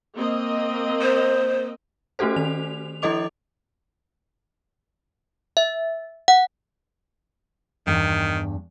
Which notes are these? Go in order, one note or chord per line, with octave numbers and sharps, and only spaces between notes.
A#3 C4 D#5
C5
A3 C#4 F#4 G4 A4 C5
D#3 F7
F3 E4 A4 D#5 D6 F7
E5
F#5
E2 G2 D#3